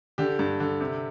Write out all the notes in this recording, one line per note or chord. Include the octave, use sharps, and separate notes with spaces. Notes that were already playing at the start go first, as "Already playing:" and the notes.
D3 G4
G2
D3
C3